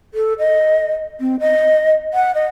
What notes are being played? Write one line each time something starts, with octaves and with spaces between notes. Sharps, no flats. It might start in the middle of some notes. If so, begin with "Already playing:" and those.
A4
D#5
C4
D#5
F#5
D#5